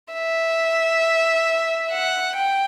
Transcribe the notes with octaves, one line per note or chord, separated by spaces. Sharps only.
E5
F#5
G5